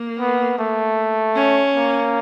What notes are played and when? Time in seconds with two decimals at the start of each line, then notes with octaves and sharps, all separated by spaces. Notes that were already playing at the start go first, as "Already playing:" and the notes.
Already playing: A#3
0.20 B3
0.59 A3
1.36 C#4
1.75 A#3